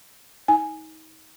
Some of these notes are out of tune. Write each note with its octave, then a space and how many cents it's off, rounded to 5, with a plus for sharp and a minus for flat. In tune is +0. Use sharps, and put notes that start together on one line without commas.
D#4 +35 G#5 +0